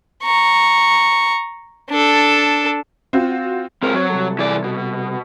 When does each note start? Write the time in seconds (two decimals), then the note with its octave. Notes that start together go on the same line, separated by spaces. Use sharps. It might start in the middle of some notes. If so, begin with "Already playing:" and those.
0.23 A#5 C#6
1.90 D4 A4
3.13 C4 F4 F#4
3.83 C#2 C4 A#4
3.94 F#3
4.10 C3 G3 A4
4.39 E3 D5
4.64 B2